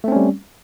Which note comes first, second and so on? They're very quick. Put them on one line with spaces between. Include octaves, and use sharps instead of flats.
A3 C4 C#4 G3